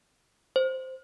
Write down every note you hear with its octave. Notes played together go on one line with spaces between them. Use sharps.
C5